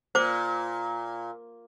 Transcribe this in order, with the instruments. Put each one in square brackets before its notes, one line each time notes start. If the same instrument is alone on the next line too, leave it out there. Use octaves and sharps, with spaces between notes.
[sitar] A#2 [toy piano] C5 D6